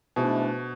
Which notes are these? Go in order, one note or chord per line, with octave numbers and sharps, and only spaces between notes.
G#2 B2 E3 A3 D4